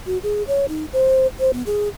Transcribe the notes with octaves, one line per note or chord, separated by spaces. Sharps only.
F#4
G#4
C#5
D#4
C5
C5
B3
G#4